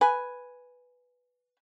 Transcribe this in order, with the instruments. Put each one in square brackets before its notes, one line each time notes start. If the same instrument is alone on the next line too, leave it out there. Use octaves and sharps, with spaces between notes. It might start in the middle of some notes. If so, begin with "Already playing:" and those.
[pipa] B4 G#5